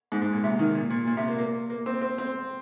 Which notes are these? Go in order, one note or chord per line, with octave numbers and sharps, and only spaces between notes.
G#2
G#2
A#2
C3
D#3
A#2
A#2
A#2
C3
A#3
A#3
A#3
C4
C4
C4